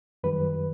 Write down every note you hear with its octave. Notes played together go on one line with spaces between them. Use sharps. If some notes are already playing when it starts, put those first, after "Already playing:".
F#2 D#3 G3 B4